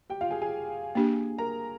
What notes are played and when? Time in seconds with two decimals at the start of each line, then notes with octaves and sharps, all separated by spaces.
0.10 G4 G5
0.21 F4 F5
0.31 G#4 G#5
0.42 G#4 G#5
0.95 A#3 D4 G4
1.38 A#4 A#5